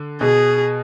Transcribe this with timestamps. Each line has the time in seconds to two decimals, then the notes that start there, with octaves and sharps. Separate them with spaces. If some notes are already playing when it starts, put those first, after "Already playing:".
Already playing: D3
0.21 B2 G#4